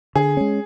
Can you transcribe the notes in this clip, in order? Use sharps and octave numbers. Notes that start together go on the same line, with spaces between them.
D3 G#4
G#3 C#4